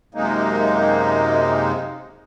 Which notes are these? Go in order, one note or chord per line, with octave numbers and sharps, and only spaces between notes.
F#2 C3 G#3 A#3 D#4